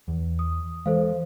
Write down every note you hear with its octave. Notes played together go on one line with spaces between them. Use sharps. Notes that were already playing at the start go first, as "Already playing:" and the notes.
E2
D#6
E3 G#3 A4 C5 F5